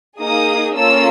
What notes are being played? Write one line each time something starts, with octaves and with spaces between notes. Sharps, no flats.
A#3 D#4 G#4 D#6
A#3 C#4 F4 A4 E6